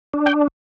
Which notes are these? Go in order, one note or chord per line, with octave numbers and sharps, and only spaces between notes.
D4
G5